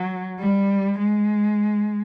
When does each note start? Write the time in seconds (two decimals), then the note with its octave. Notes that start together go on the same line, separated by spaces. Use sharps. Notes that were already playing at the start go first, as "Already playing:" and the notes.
Already playing: F#3
0.39 G3
0.98 G#3